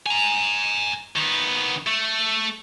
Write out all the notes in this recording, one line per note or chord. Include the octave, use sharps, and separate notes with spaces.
G#5 A#5
D#3 B3
A3